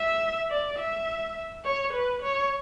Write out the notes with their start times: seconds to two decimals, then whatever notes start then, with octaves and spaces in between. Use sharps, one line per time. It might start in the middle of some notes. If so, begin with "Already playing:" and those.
Already playing: E5
0.50 D5
0.78 E5
1.65 C#5
1.93 B4
2.22 C#5